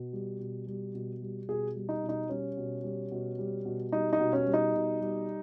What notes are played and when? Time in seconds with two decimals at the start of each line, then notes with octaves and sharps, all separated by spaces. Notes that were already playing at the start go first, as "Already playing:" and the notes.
Already playing: B2
0.13 G3
0.40 B2
0.67 G3
0.94 B2
1.22 G3
1.49 B2 G#4
1.76 G3
1.89 D#4
2.03 B2
2.09 D#4
2.29 G3 C#4
2.57 B2
2.84 G3
3.12 B2
3.39 G3
3.65 B2
3.92 G3 D#4
4.13 D#4
4.19 B2
4.33 C#4
4.47 G3
4.54 D#4
4.74 B2
5.01 G3